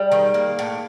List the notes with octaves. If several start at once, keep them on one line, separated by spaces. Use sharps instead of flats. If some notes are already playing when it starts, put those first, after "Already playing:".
Already playing: G3 G#4
D#3
A#3
A2